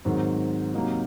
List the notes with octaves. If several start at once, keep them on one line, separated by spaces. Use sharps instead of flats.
G#2 D#3 F#3 C4
C3 F#3 A#3 D#4